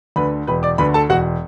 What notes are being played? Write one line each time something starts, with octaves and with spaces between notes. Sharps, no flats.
D2 D3 B4 B5
E1 B4 B5
D5 D6
D2 D3 B4 B5
A4 A5
E1 F#4 F#5